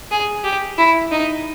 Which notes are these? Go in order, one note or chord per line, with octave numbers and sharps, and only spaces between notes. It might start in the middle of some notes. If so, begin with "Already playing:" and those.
G#4
G4
E4
D#4